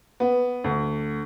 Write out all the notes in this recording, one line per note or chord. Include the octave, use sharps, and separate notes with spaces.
B3
D2